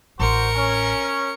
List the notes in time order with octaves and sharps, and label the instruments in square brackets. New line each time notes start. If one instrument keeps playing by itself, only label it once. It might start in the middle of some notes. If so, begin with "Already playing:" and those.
[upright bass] A1 [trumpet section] F#4 C5 [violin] A#4 C#7
[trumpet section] C#4